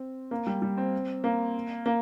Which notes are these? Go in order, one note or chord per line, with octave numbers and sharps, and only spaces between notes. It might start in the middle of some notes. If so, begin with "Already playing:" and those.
Already playing: C4
A#3
G3
G3
C4
A#3
A#3